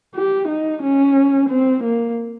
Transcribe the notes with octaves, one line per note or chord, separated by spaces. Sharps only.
G4
D#4
C#4
C4
A#3